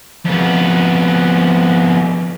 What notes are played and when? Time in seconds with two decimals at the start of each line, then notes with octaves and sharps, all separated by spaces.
0.25 F2 B3